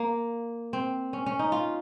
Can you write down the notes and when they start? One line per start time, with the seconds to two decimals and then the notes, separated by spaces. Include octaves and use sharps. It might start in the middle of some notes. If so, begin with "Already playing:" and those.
Already playing: A#3
0.73 C4
1.13 C#4
1.26 C#4
1.39 D#4
1.52 F4